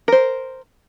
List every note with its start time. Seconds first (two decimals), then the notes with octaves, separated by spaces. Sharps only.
0.08 A#4 C5